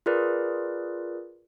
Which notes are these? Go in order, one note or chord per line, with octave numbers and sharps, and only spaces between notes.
F4 G#4 A#4 B4 D5